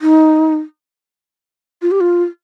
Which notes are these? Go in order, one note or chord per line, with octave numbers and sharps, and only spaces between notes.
D#4
F4
G4
F4